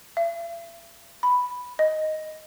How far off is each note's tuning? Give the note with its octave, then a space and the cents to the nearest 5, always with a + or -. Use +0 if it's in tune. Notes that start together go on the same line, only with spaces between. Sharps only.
E5 +45
B5 +0
D#5 +0